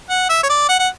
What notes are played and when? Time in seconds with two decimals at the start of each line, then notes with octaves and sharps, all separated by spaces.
0.09 F#5
0.29 E5
0.43 C#5
0.49 D5
0.69 F#5
0.79 F#5